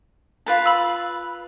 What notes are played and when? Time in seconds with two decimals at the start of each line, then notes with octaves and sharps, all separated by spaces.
0.46 F4 B4 A5
0.66 B5 E6